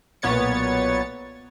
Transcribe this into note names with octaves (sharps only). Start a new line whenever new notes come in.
B1 A#2 B3 C#5 A6 C#7